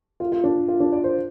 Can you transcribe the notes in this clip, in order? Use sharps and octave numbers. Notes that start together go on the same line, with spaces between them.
F4
F4
D4
F4
D4
D5
C5